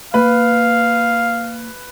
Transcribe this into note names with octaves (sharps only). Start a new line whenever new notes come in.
A#3 B4 F5